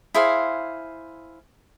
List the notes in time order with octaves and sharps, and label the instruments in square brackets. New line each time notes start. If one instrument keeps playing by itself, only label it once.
[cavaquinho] E4 G#4 C5 F5